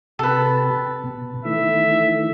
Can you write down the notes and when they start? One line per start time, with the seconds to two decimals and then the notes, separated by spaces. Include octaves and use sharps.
0.19 C3 G4 A4 B4 A5
1.04 B2
1.45 D#3 E3 A3 E5